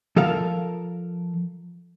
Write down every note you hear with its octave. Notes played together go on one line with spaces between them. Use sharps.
F3 A4 A#4 F5